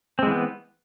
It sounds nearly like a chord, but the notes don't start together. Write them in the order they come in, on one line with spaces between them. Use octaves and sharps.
C4 G#3 E3 B3